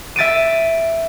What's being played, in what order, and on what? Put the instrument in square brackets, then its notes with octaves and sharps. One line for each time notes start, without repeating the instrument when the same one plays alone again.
[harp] E5 A6 D7 D#7